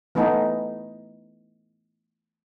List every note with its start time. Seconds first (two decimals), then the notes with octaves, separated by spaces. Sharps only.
0.15 E3 A3 B3 D#4